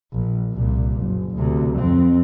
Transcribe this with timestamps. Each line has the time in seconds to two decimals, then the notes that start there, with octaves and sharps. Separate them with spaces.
0.13 A#1
0.52 C2 A#2
0.98 F#1
1.36 D2 C3
1.77 F2 C4